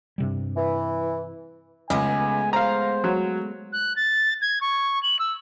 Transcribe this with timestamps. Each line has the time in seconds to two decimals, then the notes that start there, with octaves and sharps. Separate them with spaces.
0.18 G2 C3 G3
0.57 E3
1.90 C#2 G#3 A3 B3 G#5
2.53 C5 F5 A#5
3.04 F#3
3.73 F#6
3.96 A6
4.42 G#6
4.61 C#6
5.03 F#7
5.19 E6